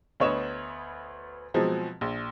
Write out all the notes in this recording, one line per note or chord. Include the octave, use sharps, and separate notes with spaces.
D2 B3 C#5 D#5 E7
B2 F3 F#3 G#3 C4
A#1